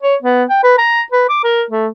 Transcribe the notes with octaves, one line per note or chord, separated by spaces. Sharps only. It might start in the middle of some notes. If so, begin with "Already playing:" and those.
C#5
B3
G5
B4
A#5
B4
D6
A#4
A3